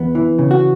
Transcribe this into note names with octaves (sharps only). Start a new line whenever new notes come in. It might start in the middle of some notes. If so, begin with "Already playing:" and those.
Already playing: E2 B3
E3
C#3
F#4